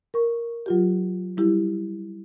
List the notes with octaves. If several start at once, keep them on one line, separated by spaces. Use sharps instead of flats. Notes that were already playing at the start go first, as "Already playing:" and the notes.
A#4 C#6
F#3 F4 G4
G3 E4 G4